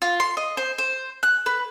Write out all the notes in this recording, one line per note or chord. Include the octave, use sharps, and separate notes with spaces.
F4
C6
D#5
C5
C5
F#6
B4